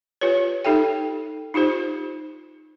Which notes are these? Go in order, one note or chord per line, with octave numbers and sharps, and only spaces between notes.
F4 G4 B4 C#5
D#4 G4 A4 E5 G5
D#4 F4 G4 C5